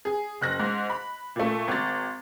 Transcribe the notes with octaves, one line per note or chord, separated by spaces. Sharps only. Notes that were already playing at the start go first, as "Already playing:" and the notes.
G#4
F#1 F#6 A#6
G#2
B5
A#2 A3
G#1 A6